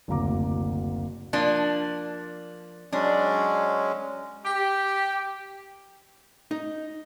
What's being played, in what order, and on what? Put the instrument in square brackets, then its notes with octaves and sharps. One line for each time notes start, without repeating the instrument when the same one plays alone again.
[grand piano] F#1 D2 C3 A#5 D6
[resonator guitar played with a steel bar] F3 A#3 D4
[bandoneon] F#3 G#3 C#4 [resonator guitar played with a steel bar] D4
[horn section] G4
[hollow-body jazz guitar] D#4